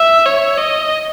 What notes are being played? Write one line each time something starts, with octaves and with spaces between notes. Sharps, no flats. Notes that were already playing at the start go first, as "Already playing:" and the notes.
Already playing: E5
C#5
D#5